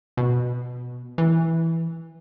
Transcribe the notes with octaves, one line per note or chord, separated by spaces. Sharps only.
B2
E3